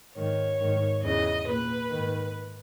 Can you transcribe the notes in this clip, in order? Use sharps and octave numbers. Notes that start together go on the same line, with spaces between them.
G#2 D#3 C#5
G#2 D#3
E2 C#3 E3 D#5
A#2 B4
G#2 D#3